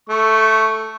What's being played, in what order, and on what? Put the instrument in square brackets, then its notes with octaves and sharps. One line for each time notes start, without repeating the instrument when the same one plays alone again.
[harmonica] A3 C#6